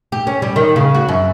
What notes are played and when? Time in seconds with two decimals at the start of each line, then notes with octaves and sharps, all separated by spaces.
0.12 G4
0.27 C#4
0.42 G3
0.56 D#3
0.76 C#3
0.95 F#4
1.09 F#2